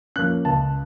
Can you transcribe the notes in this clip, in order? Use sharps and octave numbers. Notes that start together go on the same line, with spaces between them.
F3 A#3 C#4 F#6
C#2 A5